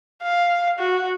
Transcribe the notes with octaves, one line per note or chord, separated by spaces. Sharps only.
F5
F#4